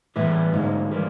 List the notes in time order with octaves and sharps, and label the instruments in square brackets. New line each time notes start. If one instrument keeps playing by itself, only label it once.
[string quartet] A2 [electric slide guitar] E3 G3 B3 E4 G4
[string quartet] G#2 [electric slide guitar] D3 F#3 A#3 D#4
[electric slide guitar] E3 G3 A#3